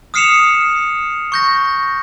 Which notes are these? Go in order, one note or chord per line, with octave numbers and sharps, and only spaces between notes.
D#6 F6 C7 C#7 E7 F7
C#6 G6 A#6